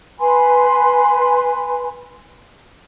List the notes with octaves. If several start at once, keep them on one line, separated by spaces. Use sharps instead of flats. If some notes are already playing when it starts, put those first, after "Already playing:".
B4 G#5 B5 C6